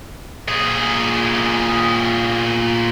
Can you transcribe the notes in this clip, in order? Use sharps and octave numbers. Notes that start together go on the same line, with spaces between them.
A#2 G#4